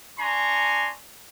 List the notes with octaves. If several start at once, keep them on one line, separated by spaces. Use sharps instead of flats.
D4 G#5 A#5 C6 C#6